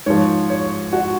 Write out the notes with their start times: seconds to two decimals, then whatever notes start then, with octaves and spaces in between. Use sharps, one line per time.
0.06 G#2 F3 C#5
0.50 C#5
0.93 F#4